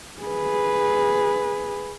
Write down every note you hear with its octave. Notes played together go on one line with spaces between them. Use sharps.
G#4 B4